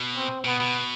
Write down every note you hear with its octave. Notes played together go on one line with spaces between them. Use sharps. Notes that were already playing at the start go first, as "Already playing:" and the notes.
Already playing: B2
C4
B2 B3
B2